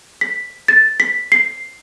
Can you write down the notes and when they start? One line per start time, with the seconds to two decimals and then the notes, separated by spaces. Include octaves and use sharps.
0.21 B6
0.68 A6
1.00 B6
1.32 C7